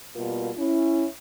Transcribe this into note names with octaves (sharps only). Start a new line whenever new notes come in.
B2 G3 A#3 F4 A#4
C#4 E4